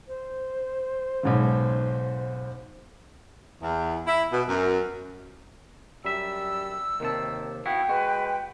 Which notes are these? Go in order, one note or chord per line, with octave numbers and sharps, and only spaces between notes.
C5
B1 G#2 C#3
E2
E4
B2
F#2
F#2 G3 E5 E6
D#2 C3 D#3 A5
B3 E4 F#4 F5 G5
G#3 F#4 B4